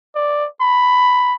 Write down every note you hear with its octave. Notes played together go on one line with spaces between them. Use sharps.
D5
B5